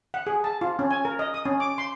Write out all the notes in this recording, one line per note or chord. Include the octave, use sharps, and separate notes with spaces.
F#5
G#4
A5
F4
C#4
G#5
A#4
D#5
D#6
C#4
D6
C6